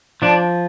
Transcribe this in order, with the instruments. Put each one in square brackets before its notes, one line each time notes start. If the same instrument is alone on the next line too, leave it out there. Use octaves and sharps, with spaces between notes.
[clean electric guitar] F3 D4